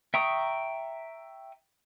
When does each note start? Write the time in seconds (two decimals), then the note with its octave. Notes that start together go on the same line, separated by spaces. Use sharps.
0.14 E5 G5 A#5 C#6 D#6